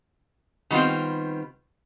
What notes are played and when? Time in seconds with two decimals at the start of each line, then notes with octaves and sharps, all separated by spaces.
0.71 D#3 G3 B3 C4 F4